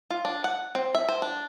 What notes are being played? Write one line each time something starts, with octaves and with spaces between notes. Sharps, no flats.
F4
D4
F#5
C4
E5
C5
D4